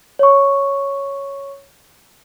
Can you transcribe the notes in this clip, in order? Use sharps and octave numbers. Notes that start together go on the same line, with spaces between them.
C#5 C#6